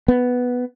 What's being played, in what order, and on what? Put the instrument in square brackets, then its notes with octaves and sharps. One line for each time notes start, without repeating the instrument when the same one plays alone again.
[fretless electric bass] B3